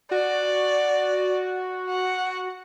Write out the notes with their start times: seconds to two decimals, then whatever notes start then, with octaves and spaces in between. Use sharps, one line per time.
0.11 F#4 D5
1.89 F#5